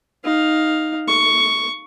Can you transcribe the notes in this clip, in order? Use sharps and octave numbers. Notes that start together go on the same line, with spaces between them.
D#4 F5
C#6